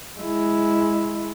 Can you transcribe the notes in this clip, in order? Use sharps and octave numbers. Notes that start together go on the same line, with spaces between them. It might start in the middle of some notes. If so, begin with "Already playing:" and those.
G#3 E4